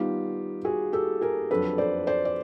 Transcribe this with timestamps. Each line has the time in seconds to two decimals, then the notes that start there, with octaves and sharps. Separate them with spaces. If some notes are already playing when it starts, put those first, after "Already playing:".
Already playing: D#3 G3 B3 D#4 F4 G4
0.65 F#4 G#4
0.93 G4 A4
1.21 G#4 A#4
1.51 F2 D3 F#3 A4 B4
1.78 C5 D5
2.07 C5 D5
2.25 D5